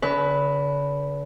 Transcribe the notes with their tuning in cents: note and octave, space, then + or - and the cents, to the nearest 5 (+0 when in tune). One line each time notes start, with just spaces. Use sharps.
D3 -45 B4 +0